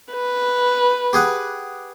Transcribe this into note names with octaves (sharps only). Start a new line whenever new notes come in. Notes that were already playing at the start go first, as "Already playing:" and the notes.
B4
G4 G#4 F#5